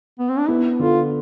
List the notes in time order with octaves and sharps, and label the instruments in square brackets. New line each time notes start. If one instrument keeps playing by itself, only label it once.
[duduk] B3
C4
D4
[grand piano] B3 [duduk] E4
[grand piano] D3 [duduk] F4